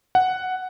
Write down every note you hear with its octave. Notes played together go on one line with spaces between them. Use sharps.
F#5